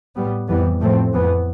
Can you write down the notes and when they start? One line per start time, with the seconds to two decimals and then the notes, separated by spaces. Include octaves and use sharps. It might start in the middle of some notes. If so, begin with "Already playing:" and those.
0.16 A2 G3 B3
0.48 F2 E3 G3 B3
0.81 A2 F3 A3 C4
1.13 F2 E3 B3